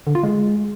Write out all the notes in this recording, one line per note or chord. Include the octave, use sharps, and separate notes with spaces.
D3
F4
G#3